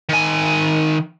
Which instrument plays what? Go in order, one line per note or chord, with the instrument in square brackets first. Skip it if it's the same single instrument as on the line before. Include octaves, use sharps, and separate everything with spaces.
[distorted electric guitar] D#3 G#5